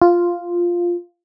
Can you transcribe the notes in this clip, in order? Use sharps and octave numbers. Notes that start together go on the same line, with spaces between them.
F4